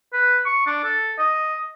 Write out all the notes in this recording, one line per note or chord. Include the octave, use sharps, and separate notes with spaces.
B4
C#6
D4
A4
D#5